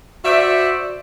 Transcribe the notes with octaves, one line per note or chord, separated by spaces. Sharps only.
F#4 C5 D5 E5